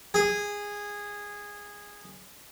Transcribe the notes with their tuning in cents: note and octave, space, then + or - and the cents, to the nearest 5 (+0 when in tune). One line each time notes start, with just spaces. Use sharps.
G#4 -15